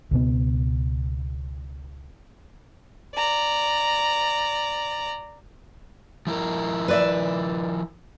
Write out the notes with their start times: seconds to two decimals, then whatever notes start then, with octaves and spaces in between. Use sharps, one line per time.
0.11 C#2 B2 B3
3.15 D5 A#5
6.27 F3 E4 A#4
6.88 B4 D5 E5